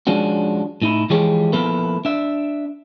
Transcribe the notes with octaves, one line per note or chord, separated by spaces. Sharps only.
F3 G#3 C#4 D4 F#4
A2 D#4 E4
E3 F3 G#3 G4 G#4 C#5
F3 A#3 B3 E4 A4 B4
D4 E5